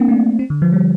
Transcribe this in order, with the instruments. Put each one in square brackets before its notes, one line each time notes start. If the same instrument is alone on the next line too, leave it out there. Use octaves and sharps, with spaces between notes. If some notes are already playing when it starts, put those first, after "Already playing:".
Already playing: [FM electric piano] A#3 C4 D4
A3
C4
D3
F3
G3